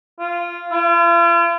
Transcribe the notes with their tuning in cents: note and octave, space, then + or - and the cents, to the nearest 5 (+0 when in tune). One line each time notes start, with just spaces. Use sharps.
F4 -10
F4 -45